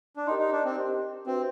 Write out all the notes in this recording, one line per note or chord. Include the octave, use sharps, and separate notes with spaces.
D4
D#4 G4 A#4 D#5 G5 C6
D#4
D4
C4
G4 A#4 D#5 G5 C6
C4 D4 F#4 B4 E5 G5